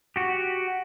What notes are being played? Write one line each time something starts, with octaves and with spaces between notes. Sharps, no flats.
F#4 G4